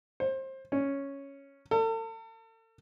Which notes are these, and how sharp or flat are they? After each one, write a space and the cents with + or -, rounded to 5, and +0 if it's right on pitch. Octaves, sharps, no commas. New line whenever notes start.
C5 +25
C#4 +0
A4 +40